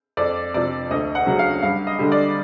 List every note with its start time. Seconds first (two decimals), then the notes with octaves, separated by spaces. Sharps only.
0.17 F2 D5
0.54 C3 F3 D5
0.91 D2 D#5
1.15 F#5
1.26 C#3 F#3
1.39 F5
1.63 G2 F5
1.87 D#5
1.99 D3 G3
2.12 D5